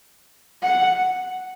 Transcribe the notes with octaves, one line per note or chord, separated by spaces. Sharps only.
F#5